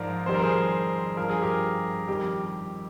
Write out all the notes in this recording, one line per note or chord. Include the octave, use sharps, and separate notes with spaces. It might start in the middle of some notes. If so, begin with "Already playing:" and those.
Already playing: G#2 F3 A#4 D5
F2 D#3 G3 C5
A#4
G#4 C5
G2 F3 A#4
G#4
G4 A#4
F2 D#3 G3 G4